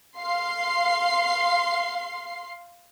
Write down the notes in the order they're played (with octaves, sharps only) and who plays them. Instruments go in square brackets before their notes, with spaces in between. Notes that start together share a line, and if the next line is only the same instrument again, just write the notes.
[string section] F5 C6 C7